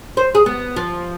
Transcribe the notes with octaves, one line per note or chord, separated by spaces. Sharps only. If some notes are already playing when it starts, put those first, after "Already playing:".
C5
G#4
B3
F3